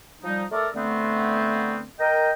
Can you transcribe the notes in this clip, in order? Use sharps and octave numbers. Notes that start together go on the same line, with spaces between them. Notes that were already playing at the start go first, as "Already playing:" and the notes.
F3 G3 D#4
A3 A4 A#4 D5
D3 A3 B3 C4
A#4 D#5 G5